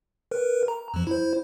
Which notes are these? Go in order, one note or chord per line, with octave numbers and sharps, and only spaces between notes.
A#4 B4
A#5
F2 F3
E4 C5